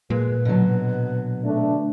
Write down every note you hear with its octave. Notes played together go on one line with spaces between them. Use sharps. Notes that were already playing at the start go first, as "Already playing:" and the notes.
A#2 G#3 B4
B2 D3 F#3
A3 D4